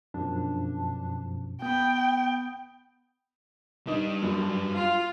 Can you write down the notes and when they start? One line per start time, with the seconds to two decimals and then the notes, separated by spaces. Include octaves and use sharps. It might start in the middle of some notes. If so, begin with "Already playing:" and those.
0.14 F#2 B2 F3 D4
1.62 B3 G5 B5 D#6 G6
3.87 G3 D4 D#4
4.22 F#2
4.74 F4